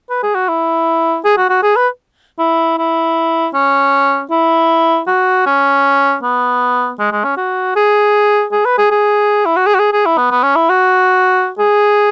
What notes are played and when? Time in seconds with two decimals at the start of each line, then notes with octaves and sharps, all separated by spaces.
0.10 B4
0.23 G#4
0.35 F#4
0.48 E4
1.24 G#4
1.37 F#4
1.49 F#4
1.63 G#4
1.76 B4
2.39 E4
2.78 E4
3.54 C#4
4.31 E4
5.07 F#4
5.46 C#4
6.23 B3
6.99 G#3
7.12 G#3
7.24 C#4
7.37 F#4
7.76 G#4
8.52 G#4
8.65 B4
8.78 G#4
8.91 G#4
9.46 E4
9.56 F#4
9.67 G#4
9.74 F#4
9.79 G#4
9.93 G#4
10.06 E4
10.17 B3
10.31 B3
10.43 C#4
10.56 E4
10.69 F#4
11.59 G#4